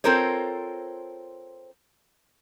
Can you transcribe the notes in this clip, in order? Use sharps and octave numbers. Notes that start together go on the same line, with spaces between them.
C4 F4 A4 A#4 C5 C#5